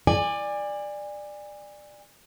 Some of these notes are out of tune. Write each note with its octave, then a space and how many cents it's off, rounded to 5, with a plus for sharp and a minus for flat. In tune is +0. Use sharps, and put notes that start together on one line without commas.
D5 +15 G#5 -25